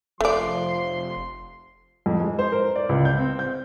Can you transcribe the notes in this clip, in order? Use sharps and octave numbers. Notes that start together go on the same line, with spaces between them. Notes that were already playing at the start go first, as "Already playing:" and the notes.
F1 F3 A3 D5 C6
F2
G#3
C5
A#4
D5
C#2
G6
C4
G6